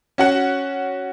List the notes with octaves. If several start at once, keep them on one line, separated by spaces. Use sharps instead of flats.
C#4 F#4 F#5